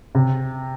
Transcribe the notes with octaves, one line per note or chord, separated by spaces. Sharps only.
C3